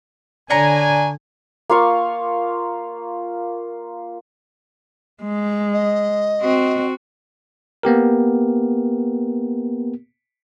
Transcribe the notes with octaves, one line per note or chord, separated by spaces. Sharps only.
D3 D4 C#5 G#5 A#5
A#3 F4 F5 C#6
G#3
D#5
C4 F#4
A#3 B3 G4 A#4